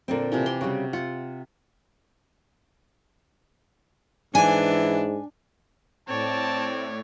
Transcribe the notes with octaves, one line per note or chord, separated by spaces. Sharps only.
A#2 D3 C4
C3 E3 F3
G4 C6
C#3 G3 F#4
F4 F#5
G#2 E3 D4 G#5
A2 C4 C#5 D5 A5